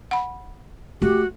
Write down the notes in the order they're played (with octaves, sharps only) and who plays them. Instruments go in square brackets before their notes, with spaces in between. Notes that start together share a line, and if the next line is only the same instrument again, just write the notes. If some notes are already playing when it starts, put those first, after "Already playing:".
[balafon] F#5 B5
[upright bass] A3 [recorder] F#4 [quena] G4